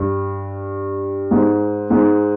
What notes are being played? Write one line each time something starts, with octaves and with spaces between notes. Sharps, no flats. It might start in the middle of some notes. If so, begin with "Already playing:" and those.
Already playing: G2
G#2
G#2